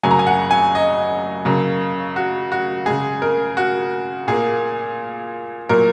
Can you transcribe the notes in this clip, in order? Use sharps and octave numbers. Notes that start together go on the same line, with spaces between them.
F#2 C#3 F#3 A#3 G#5
A#5
G#5
F#5
G#5
D#5
C#3 F#3 A#3
F#4
F#4
C#3 G#3 G#4
A#4
F#4
A#2 A#3 G#4
A#2 F#3 A#3 A#4